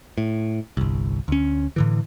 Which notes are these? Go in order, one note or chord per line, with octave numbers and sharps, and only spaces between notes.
A2
G1 C2
D2 C#4
A2 D3 E3